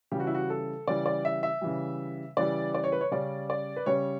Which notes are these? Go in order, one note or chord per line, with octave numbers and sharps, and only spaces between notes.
C#3 E3 G3 G4
F#4
E4
F#4
A4
C#3 E3 G3 D5
D5
E5
E5
C#3 E3 G3
C#3 E3 G3 D5
D5
C#5
B4
C#5
C#3 G3 C#4 D5
D5
B4
C#3 G3 C#4 C#5